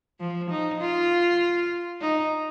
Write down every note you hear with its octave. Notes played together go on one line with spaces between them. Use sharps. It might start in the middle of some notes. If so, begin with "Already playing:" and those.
F3
D#4
F4
D#4